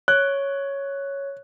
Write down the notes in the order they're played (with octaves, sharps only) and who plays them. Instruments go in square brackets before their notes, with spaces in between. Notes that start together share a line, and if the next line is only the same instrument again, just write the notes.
[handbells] C#5 [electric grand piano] F#6